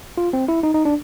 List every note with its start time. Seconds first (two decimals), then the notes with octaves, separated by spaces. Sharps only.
0.18 F4
0.33 C4
0.48 E4
0.63 D#4
0.74 D#4
0.85 D4